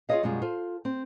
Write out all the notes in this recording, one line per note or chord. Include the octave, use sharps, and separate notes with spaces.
F4 G#4 B4 C#5 D#5 F5
F#2 B2 G3 G#3 F4
F4 A4 C5
C4